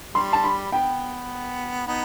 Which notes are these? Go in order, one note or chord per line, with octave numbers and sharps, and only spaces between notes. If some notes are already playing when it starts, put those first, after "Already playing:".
G3 C6
A5
B5
B3 G5
B3 D#4